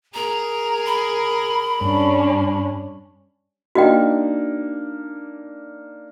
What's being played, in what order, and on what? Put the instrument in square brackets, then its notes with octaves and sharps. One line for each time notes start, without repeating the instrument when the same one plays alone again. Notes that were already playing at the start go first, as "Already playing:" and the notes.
[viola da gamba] G#4 A#4 [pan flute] A#5
[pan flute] B5
[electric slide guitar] G2 [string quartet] G3 C#4 D4
[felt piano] A#3 D4 D#4 [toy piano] F#4 D#5 G5